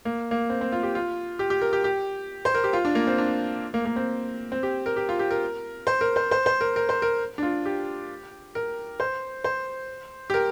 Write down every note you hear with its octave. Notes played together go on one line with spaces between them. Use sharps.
A#3
A#3
C4
C4
F4
G4
F4
G4
G4
A#4
G4
G4
C5
A#4
G4
F4
D4
A#3
C4
D4
A#3
A#3
C4
C4
G4
A#4
G4
F4
G4
A#4
C5
A#4
C5
C5
C5
A#4
A#4
C5
A#4
D4
F4
G4
A#4
C5
C5
G4
A#4